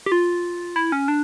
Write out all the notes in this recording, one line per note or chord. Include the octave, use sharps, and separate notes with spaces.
G4
F4
E4
C#4
D4